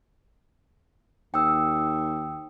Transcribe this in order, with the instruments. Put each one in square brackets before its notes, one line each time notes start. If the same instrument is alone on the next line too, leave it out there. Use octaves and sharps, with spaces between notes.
[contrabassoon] D#2 [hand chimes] G5 D#6 E6